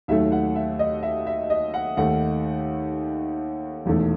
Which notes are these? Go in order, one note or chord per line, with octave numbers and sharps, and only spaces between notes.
D#2 D#3 F#3 A3 E5
F#5
E5
D#5
E5
E5
D#5
F#5
D#2 D#3 A3 F#5
E1 E2 D#3 A3